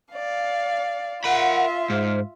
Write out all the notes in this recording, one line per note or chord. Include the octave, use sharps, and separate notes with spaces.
D5 F5
F4 A#4 E5 F#5 B5
G#2 C5 F6